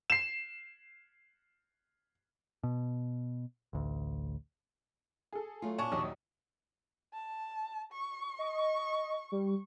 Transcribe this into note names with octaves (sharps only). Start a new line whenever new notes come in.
C7 E7
B2
A1 D2
G#4 A4
F#3 A3 F4
A#2 C#4 D4 G#5 A5 C#6
A#1 D#2 F#3 D#5 D#6
A5
C#6
D#5
G3